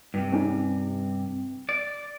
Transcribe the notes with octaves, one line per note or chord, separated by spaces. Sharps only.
G2 C3
C4 C#4 D#4
D5